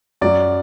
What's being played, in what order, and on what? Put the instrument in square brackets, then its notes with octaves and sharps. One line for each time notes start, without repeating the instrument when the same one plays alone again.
[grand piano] F#2 F#3 D5